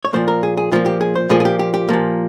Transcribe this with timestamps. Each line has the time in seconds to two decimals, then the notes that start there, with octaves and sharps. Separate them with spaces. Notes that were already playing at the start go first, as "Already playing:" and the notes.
0.05 C#5
0.13 A#2 F3 A#3 C5
0.28 A#4
0.43 G#4
0.57 G#4
0.71 A#2 F3 A#3 F4
0.86 G4
1.01 G#4
1.15 C5
1.29 A#2 F3 A#3 G#4
1.40 G#4
1.45 G4
1.59 G4
1.74 G4
1.89 A#2 F3 A#3